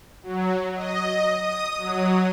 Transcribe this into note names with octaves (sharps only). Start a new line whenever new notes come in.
F#3
D#5
D#6
F#3